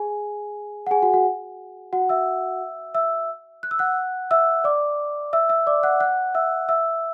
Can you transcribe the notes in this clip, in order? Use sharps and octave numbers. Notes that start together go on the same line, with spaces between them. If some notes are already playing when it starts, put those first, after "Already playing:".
Already playing: G#4 G#5
F#5
G#4 G#5
F#4 F#5
F#4 F#5
F#4 F#5
E5 E6
E5 E6
F#6
E6
F#5 F#6
E5 E6
D5 D6
E5 E6
E5 E6
D5 D6
F#5 F#6
F#5 F#6
E5 E6
E5 E6